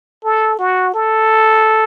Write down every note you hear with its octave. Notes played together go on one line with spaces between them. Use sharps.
A4
F#4
A4